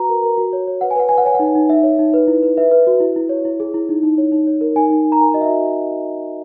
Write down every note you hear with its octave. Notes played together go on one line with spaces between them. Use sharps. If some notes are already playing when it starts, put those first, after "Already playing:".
Already playing: F#4 B4 A#5
A#4
A#4
F#4
C#5
C#5
B4 F#5
G#5
B4 F#5
B4 G#5
F#5
C#5 G#5
F#5
D#4
D#4
D#4 E5
C#5
D#4
B4
E4
B4
B4 E5
B4
F#4
E4
E4
C#5
E4
G#4
E4
D#4
D#4
C#5
D#4
C#5
A#4
D#4 G#5
D#4
D#4
A#5
A#4 G#5
F#4 D#5
E5
F#4